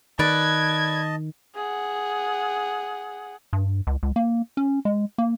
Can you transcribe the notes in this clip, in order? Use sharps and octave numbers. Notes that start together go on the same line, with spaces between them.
D#3 B4 D5 D#5 A5 G#6
G#4 F#5
G2
C#2
C#2
A#3
C#4
G#3
A#3